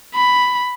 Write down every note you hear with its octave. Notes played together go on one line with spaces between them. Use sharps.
B5